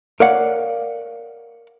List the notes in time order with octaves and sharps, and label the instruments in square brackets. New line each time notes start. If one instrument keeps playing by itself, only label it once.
[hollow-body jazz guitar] A#4 C#5 D5 F5 F#5